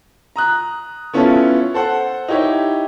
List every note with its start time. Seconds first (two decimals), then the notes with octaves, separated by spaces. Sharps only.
0.36 A#5 D#6 F#6
1.13 B3 C#4 E4 F4 A4
1.74 A4 C5 F#5
2.28 D#4 E4 G4 C#5